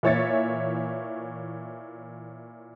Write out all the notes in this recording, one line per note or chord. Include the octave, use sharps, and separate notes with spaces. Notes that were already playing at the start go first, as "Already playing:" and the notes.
A#2 E3 C#5 E5 A6 C#7